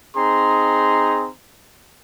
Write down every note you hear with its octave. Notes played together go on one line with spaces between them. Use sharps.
C4 D#4 G#4 A#5 C6